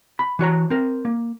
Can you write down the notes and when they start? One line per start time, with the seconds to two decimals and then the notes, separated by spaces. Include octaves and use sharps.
0.19 B5
0.39 E3 F#4 C#5 A#5
0.70 C4 A#4
1.05 A#3